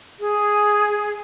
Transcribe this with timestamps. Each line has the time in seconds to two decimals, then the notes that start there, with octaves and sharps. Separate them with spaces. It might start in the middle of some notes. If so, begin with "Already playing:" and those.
0.20 G#4